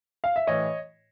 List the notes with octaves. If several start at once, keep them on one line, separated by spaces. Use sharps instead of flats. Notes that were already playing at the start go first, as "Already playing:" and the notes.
F5
E5
A2 E3 C#5 D#5